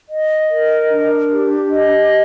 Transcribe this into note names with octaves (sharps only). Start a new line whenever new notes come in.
D#5
A#4
D4
G4
D#5